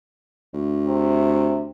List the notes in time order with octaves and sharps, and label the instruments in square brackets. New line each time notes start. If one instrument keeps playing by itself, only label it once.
[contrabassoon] D2
[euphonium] C3